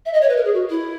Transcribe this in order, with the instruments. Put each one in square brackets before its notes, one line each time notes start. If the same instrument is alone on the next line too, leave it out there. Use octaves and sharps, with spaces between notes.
[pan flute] E5
D#5
C#5
B4
A#4
G#4
F#4
E4